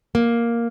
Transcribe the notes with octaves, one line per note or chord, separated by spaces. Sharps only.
A#3